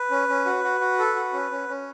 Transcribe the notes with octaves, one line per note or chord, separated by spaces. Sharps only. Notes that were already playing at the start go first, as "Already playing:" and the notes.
Already playing: B4
C#4
C#4
F#4
F#4
F#4
A4
F#4
C#4
C#4
C#4